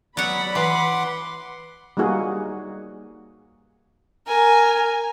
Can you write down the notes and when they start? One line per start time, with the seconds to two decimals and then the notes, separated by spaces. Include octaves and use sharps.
0.17 F#3 B3 D5 F#5 B5
0.55 E3 F#5 C6 D6
1.97 G3 A#3 D#4 F#4 G#4
4.28 A#4 G#5